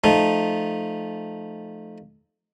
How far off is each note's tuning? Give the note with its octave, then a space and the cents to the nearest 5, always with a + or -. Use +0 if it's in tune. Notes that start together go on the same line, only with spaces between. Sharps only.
F3 +0 A3 -15 D#4 -15